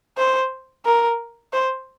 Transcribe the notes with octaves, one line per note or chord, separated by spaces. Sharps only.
C5
A#4
C5